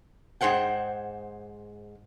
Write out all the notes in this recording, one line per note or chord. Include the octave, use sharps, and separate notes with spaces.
G#2 G#4 C5 F#5 G5